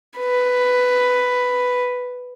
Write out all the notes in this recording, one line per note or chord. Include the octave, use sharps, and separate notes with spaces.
B4